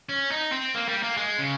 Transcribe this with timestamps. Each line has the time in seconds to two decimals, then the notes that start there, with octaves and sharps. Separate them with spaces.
0.09 C#4
0.31 D#4
0.52 C4
0.74 A#3
0.88 G3
1.03 A#3
1.17 G#3
1.38 C#3